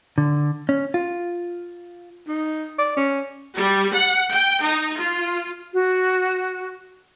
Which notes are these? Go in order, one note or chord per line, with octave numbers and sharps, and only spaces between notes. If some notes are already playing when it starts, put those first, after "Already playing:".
D3
C#4
F4
D#4
D5
C#4
G3
F#5
G5
D#4
F4
F#4